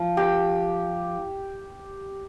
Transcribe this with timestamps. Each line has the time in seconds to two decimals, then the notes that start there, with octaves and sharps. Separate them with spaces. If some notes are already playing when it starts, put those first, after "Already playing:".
Already playing: F3
0.17 G4